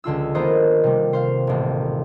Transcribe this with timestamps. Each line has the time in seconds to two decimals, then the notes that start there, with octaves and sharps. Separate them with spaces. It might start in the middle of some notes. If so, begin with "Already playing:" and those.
0.04 C#2 D3 F4 E6
0.35 D#3 A#3 B3 C5 D#5
0.83 C3 G3
1.13 C5 F5
1.47 D#1 A1